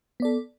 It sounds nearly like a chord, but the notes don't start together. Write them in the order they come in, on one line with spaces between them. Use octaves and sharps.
B3 D5 A4